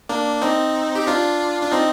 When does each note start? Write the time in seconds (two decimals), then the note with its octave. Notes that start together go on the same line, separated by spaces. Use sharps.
0.09 A#3 D4
0.42 C4 D#4
0.95 G4
1.07 D4 F4
1.62 D4
1.71 C4 D#4